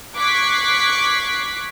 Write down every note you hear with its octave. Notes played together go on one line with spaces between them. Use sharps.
C#6 D6 F#6 G#6 B6 C7